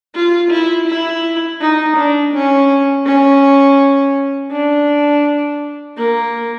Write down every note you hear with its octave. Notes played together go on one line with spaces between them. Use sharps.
F4
E4
E4
D#4
D4
C#4
C#4
D4
A#3